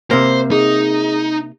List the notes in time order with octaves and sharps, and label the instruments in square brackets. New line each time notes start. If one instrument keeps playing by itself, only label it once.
[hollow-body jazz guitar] C3 A#3 [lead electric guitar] C5
[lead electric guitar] D#4 [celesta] G#4